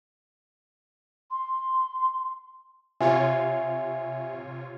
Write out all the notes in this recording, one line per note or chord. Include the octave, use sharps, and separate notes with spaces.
C6
C3 F4 C#5 E5 G#5